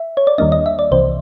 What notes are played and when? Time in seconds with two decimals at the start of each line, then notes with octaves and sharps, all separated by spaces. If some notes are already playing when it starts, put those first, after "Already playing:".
Already playing: E5
0.17 C#5
0.27 D5
0.38 D#2 D#3 G3 A#3 D4 D#5
0.52 D#5
0.66 E5
0.79 D5
0.91 C2 C3 E3 C5